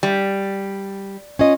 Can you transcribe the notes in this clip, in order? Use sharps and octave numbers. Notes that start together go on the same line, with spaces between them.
G3
C#4 F4 D#5